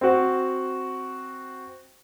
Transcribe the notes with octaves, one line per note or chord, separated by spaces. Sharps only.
C4 F#4